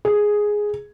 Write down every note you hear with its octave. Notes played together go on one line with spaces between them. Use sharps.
G#4